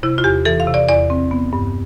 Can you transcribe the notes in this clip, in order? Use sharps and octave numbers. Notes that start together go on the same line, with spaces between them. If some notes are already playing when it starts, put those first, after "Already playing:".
C3 E4
F4
E2 G4
E3 A4
F5
C3
D5
E2 D5
C4
B3
G2